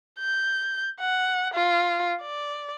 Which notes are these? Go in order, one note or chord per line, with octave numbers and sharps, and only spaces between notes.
G6
F#5
F4
D5